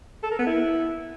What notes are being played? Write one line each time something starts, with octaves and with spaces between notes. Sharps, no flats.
A4
A#4
B3
E4